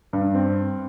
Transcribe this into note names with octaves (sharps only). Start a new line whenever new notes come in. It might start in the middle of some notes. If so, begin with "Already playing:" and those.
G2
C4